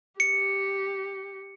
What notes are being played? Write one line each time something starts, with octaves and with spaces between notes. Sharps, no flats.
G4 C#7